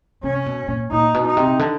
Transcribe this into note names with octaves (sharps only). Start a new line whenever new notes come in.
C3 C#4
B2
A#2
A#2 D#4
B2
D#4
C3
D3